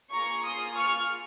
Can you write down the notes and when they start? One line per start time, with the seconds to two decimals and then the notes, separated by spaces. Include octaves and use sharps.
0.12 A#3 F4 G#4 A#5 C#6
0.45 C6 D#6
0.77 C#6 F6